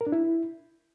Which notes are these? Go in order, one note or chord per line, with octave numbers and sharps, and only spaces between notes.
A#4
D4
E4